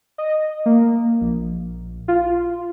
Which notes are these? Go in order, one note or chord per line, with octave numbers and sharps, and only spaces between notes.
D#5
A#3
A#1
F4